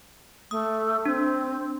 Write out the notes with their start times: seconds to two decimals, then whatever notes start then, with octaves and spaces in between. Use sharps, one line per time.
0.51 A3 D#6
1.05 C4 D4